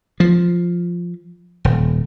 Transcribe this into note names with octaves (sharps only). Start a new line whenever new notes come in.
F3
D#1